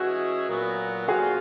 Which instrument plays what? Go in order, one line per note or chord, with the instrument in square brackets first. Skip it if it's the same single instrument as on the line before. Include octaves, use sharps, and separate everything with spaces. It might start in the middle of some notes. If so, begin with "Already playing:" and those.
Already playing: [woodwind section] E3 G#3 C#4 E4 G#4 [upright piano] F#4
[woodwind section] A#2 F#3 B3
[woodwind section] A#2 F3 A#3 C#4 F4 [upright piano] F#4 G#4